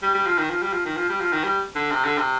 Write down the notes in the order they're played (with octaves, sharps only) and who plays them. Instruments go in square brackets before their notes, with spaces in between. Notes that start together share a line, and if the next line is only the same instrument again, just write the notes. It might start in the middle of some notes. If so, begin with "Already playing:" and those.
[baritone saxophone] G3
G3
F3
D#3
F3
G3
F3
D#3
F3
G3
F3
D#3
G3
D3
C3
D3
C3